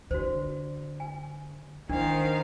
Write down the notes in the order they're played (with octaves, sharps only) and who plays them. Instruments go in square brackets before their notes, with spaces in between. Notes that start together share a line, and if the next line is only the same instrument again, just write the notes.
[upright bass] D3 [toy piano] F#4 C5
[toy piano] G#5
[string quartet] D#3 C5 F5 [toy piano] D4 [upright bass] E4